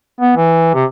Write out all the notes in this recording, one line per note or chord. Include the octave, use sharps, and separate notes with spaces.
B3
E3
C3